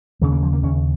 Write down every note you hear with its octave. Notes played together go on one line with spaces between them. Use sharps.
D#2 C#3 G#3
A#3
F3
A#3
D#2 C#3 C#4